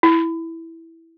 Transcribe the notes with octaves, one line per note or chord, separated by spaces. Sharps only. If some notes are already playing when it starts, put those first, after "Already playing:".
E4